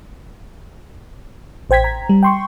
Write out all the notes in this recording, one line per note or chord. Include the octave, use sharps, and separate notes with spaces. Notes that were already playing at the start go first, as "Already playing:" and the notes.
A1 C5 G5 G#6 B6
A#5
G3
G5 C6 C#6